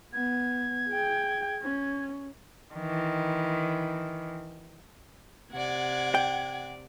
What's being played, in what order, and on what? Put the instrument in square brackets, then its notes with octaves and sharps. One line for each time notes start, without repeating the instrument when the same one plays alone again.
[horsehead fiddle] B3 [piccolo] G#6
[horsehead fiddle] G#4 G5
C#4
[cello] D#3 E3
[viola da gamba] C3 D5 [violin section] F#5 G#6
[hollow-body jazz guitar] G5